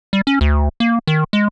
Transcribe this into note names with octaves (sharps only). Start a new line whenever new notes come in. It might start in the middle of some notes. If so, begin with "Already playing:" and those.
G3
C#4
D2
A#3
D#3
G#3